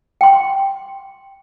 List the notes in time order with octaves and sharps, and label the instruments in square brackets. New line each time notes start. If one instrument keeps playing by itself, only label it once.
[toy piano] G5 C6